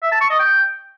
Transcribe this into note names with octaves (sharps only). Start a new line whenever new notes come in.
E5
A5
C#6
D#5
G5